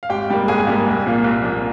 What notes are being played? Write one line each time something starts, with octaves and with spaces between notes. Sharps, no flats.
F5
G#1 G4 G5
G#2 G3 A#3
G#1 G#4 G#5
G#2 G3 A#3
C2
A#2 F3 A#3
C2
A#2 F3 A#3